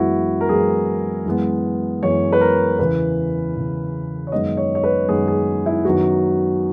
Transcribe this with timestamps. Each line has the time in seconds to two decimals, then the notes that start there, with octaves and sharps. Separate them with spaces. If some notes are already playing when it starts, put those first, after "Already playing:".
Already playing: F#2 E3 G#3 B3 E4 F#4
0.41 A#4
0.49 F#2 E3 G#3 B3 G#4
1.26 F#2 E3 G#3 B3
2.02 F#2 E3 G#3 B3 C#5
2.33 B4
2.41 A#4
2.79 E2 C#3 E3 B4
3.55 E2 C#3 E3
4.27 C#5
4.32 F#2 D#3 G#3 B3 D#5
4.57 C#5
4.75 C#5
4.84 B4
5.08 F#2 D#3 G#3 B3 G#4
5.28 G#4
5.66 E4
5.85 F#2 D#3 F#3 B3 F#4